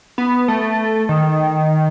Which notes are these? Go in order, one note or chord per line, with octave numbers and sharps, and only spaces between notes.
B3
A3
D#3